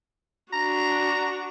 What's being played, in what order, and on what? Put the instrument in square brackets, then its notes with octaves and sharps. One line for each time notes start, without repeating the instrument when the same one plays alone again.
[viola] D4 F#4 [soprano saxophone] A#5